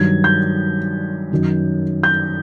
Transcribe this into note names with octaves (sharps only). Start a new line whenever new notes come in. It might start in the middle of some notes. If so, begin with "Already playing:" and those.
Already playing: G2 D#3 F#3 G#6
G6
F#2 D#3 F#3
G6